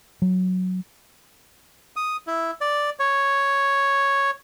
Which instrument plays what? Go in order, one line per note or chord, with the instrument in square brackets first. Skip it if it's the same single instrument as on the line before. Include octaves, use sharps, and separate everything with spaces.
[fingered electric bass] F#3
[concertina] D#6
E4
D5
C#5